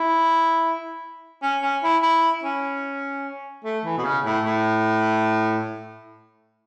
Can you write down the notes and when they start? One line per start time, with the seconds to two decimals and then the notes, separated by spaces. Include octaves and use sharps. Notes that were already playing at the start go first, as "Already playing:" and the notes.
Already playing: E4
1.42 C#4
1.63 C#4
1.83 E4
2.02 E4
2.43 C#4
3.64 A3
3.85 E3
3.97 B2
4.04 C#3
4.24 A2
4.44 A2